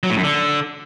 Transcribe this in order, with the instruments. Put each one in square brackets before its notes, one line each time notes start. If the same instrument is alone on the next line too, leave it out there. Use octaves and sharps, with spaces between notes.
[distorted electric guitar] F#3
A2
F#2
D3